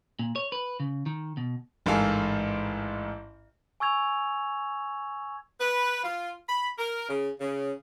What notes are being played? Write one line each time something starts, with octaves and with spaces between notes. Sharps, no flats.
A#2
C#5
B4
C#3
D#3
B2
A1 G#2 A4 A#4 F5 G#5
G#5 C#6 E6 G#6 F7
B4
F4
B5
A#4
C#3
C#3